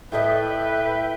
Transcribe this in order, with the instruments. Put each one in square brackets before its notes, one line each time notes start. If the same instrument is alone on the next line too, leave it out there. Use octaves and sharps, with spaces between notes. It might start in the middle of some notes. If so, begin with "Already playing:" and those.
[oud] A2 A4 D#5 [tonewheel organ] E4 G5 [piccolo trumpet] B4 [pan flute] E5